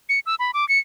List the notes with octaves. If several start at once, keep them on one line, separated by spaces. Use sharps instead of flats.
C#7
E6
B5
D6
C#7